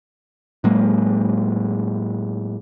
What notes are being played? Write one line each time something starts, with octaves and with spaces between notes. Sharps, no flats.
A2 F#3 G#3 A#3